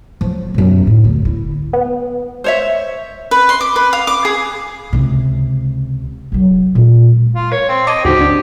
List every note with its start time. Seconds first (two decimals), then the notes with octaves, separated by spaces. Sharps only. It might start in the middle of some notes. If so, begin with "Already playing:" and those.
0.21 F3 F#3
0.54 F#2 B2
0.87 A2
1.04 D2
1.25 E4
1.73 B3
2.44 C5 C#5 E5
3.31 B4
3.49 C6
3.61 D6
3.76 B4
3.93 F5
4.07 D6
4.25 G#4
4.93 C#2 C3
6.32 F2 F#3
6.75 A#2 G#3
7.35 F4
7.52 A#4 C#5
7.69 C4
7.87 D#5 A5 C6 D6 G#6
8.05 D2 G#2 D3 F#4 G4 C5
8.21 D4